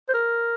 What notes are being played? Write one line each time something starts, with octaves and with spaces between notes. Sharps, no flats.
C5
A#4